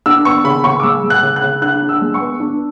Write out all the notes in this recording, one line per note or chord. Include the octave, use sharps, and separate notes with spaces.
D4 E6
B3 C#6
C#3 B5
C#3 C#6
D6
G#3 E6
G#3
F#6
C#3
F#6
C#3
D4 F#6
D4
E6
G#3
C#6
B3
D4